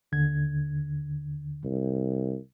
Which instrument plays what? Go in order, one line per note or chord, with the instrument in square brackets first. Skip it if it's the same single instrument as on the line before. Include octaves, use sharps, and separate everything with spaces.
[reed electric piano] D#2 D3 G#6
[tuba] C2